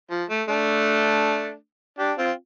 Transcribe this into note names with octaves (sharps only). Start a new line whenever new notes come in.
F3
A3
A3 D4
D4 G4
C4 F4